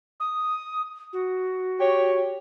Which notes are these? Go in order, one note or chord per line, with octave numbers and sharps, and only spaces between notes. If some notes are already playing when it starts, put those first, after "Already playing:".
D#6
F#4
G4 C#5